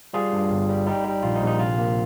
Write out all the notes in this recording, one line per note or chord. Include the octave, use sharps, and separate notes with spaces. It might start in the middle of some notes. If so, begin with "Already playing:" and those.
G3 F4 G#4
G2
G1
G3
G3 D#4
G3
A#1 F4
D#4
A#1
D#4
C3 F4
A#3